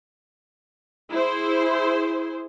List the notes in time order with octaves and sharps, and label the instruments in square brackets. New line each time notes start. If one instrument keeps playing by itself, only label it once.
[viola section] E4 G#4 C5